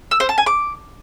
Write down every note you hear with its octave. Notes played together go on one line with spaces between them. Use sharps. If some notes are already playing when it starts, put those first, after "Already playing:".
E6
C5
A5
G#5
D6